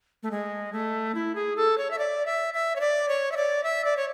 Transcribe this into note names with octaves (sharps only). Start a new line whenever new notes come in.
A3
G#3
A3
E4
G#4
A4
C#5
E5
D5
E5
E5
C#5
D5
C#5
E5
D5
E5
D5
C#5